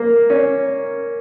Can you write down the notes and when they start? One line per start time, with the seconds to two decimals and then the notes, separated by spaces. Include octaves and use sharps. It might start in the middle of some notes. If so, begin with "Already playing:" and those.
Already playing: A#3
0.30 C#4